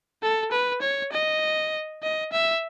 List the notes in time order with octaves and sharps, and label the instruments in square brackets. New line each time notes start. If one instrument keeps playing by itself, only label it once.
[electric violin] A4
B4
C#5
D#5
D#5
E5